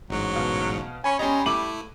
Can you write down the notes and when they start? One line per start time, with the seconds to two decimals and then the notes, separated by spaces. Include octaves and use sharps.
0.10 A1 G#2 F#3
0.36 B2 F5
1.04 C#4 G#5 B5 C#6
1.19 G3 C#4 D#5 A#5 C6
1.46 A3 E4 D6 D#7 F#7